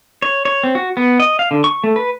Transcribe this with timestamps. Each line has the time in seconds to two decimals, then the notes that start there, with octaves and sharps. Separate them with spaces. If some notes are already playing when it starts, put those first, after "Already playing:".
0.22 C#5
0.45 C#5
0.64 C4
0.75 F#4
0.97 B3
1.20 D#5
1.39 F5
1.51 D3
1.64 C#6
1.84 A3
1.96 B4